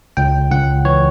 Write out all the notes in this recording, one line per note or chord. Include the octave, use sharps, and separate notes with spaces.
C#2 G5
C#2 F#5
E3 C#5